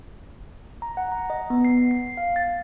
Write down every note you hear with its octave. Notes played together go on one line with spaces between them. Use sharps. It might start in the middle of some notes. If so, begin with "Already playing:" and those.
A#5
F#5
A#5
D#5
B3
C7
C7
F5
A6